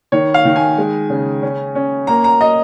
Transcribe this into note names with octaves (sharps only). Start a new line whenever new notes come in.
D#3 C#5
F5
D#3
G#5
G#3
C#3
C#4
C#4
A#3 A#5
A#5
D#5